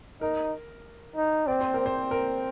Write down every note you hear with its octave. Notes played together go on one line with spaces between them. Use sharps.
D#4 A#4
D#4
C4 D5
C5
A#4
C4
C5
A#4